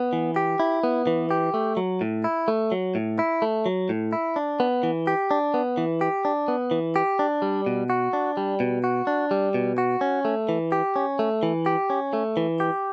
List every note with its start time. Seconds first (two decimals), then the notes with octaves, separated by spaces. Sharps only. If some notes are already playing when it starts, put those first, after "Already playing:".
Already playing: B3
0.13 E3
0.36 G4
0.60 E4
0.83 B3
1.07 E3
1.31 G4
1.54 A3
1.77 F#3
2.01 A2
2.24 E4
2.48 A3
2.72 F#3
2.95 A2
3.19 E4
3.42 A3
3.66 F#3
3.89 A2
4.13 E4
4.36 D4
4.60 B3
4.83 E3
5.07 G4
5.31 D4
5.54 B3
5.77 E3
6.01 G4
6.25 D4
6.48 B3
6.71 E3
6.96 G4
7.19 D4
7.42 G3
7.66 B2
7.90 F#4
8.13 D4
8.37 G3
8.60 B2
8.84 F#4
9.07 D4
9.31 G3
9.54 B2
9.78 F#4
10.01 C#4
10.25 A3
10.49 E3
10.72 G4
10.96 C#4
11.19 A3
11.43 E3
11.66 G4
11.90 C#4
12.13 A3
12.37 E3
12.60 G4